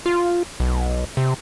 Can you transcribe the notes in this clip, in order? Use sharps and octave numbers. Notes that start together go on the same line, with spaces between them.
F4
B1
C3